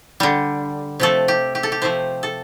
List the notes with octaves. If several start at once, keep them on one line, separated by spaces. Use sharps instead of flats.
D3 G3
C3 F3 A3 A4
G4
G4
A4
G4
C3 F3 A3 C5
A4